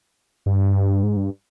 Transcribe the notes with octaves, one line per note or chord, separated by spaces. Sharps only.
G2
G#2
G2